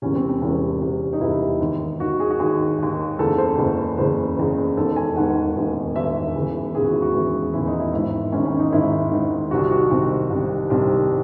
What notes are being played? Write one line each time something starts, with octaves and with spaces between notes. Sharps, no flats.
E1 E2 C3 C#4
C4
C4
E1 E2 C3 C#4
E1 E2 C3
D#4
E1 E2 C3 E4
D#2 D#3
D#2 D#3 F#4
G#4
F#4
D#2 D#3 G#4
D#2 D#3
F#1 E2 C#3 A4
C5
F#1 E2 C#3
F#1 E2 C#3 C5
F#1 E2 C#3
E1 D#2 D#3 A4
G#5
E1 D#2 D#3 F#5
E1 D#2 D#3
E1 D#2 D#3 E5
E1 D#2 C#3 E3
E1 D#2 C#3 E3 G#4
F#4
E4
F#4
E1 D#2 C#3 E3
E1 D#2 C#3 E3 E4
D#4
E4
G#1 G#2 D#3 E4
G#1 G#2 D#3 C#4
C#4
D#4
G#1 G#2 D#3 E4
G#1 G#2 D#3
C2 C3 D#3 F#4
F#4
C2 C3 D#3 C4
C2 C3 D#3
C2 C3 D#3 C4